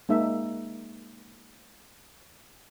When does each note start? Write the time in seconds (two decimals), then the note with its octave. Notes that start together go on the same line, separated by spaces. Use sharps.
0.09 G#3 A#3 D#4 E5